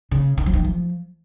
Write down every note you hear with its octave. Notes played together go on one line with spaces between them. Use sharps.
C#3
D#3
F3
D#3
F3